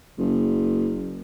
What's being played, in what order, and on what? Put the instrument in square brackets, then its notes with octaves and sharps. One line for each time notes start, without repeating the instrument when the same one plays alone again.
[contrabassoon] F#1